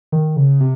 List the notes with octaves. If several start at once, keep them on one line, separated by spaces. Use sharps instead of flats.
D#3
C#3
C3